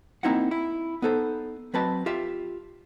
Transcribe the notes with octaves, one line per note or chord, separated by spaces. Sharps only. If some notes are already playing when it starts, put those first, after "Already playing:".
A#3 C4 D#4 E4 D#5 F#5
E4
B3 D#4 A4 C5
F#3 C4 B4 D#5 A5
F4 G4 E5